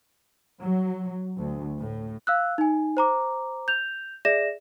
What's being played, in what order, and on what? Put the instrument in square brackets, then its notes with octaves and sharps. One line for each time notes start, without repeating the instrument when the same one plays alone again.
[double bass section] F#3
D2
A2
[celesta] F5 E6 F#6
D#4 G#5
C5 A#5 D6
G6 F7
G#4 D5 E5 A#6 E7